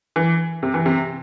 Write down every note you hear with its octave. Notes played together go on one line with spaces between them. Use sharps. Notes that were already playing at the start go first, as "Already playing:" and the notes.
E3
C3
E3
C3